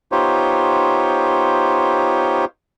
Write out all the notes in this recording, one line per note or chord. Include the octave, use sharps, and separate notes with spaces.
B3 D#4 F4 G4 C5 C#5